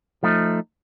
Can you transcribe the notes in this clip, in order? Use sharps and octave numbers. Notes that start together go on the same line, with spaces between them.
F3 A3 D#4